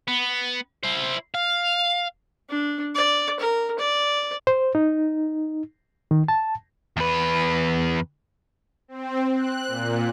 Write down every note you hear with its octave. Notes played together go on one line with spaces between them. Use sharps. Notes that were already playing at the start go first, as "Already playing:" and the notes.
B3
E4 C5
F5
D4
D5
A#4
D5
C5
D#4
D#3
A5
E2 B4
C4
F#6
A#2